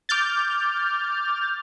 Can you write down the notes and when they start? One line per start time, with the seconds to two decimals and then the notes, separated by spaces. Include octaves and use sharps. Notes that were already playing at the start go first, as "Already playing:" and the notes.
0.09 D6 F6 G6 A6